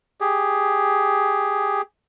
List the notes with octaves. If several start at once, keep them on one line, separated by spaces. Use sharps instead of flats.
G4 G#4